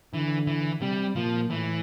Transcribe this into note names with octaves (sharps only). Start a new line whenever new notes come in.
D3 E3
E3
C3 G3
A#2 F3
A2 E3